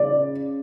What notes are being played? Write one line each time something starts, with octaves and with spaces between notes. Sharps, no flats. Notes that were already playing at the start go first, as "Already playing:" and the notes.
Already playing: C#3 D5